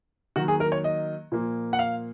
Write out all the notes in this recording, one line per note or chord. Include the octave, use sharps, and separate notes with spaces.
D#3 F#3 A#3 F#4
G#4
A#4
C#5
D#5
A#2 F3 A#3
F#5
F5